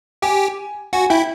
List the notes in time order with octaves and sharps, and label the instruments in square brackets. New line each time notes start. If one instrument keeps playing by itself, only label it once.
[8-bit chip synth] G4 [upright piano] G#5
[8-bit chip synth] F#4 [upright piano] G#5
[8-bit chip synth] E4 [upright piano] G5